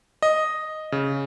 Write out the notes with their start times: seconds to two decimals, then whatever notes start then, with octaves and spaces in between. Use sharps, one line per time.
0.22 D#5
0.92 C#3